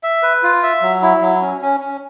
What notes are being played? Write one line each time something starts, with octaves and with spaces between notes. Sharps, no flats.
E5
B4
F4
E5
F#3
E4
F#3
C#4
C#4
C#4